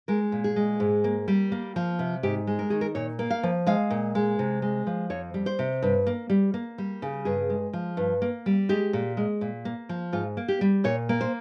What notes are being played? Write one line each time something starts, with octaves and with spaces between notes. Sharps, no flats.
G#3 A#4
A#2
G#4
G#3
G#2
A#3
G3
A#3
F3
C3
G#2 G4
G#3
A#4
D#3 G#4
A#4
A#2 C#5
A#3
F5
F3
G#3 F5
A#2
G#3
C3
G#3
F3
F2 C#5
G3
C5
C3
G2
A#3
G3
A#3
G3
C#3
G2 G#4
G#3
F3
G2
A#3
G3
G#3 G4
A#2
G#3
A#2
A#3
F3
G#2 F4
A#3
G4
G3
A#2 C#5
A#3
C5